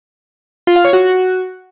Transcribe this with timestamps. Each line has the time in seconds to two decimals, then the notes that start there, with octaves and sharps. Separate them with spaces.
0.67 F4
0.76 F5
0.85 C#5
0.93 F#4